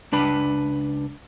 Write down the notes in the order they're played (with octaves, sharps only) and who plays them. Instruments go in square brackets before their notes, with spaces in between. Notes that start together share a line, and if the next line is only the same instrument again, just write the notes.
[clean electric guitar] C#2 D4 B4 B5